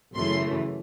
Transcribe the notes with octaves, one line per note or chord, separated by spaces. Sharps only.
F#2 C#3 E3 A3 C6